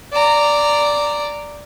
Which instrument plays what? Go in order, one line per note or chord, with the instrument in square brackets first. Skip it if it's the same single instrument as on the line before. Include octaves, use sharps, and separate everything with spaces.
[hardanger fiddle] D5 A#5